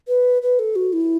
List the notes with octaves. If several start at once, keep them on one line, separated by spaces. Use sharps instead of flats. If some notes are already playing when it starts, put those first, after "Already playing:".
B4
B4
A4
F#4
E4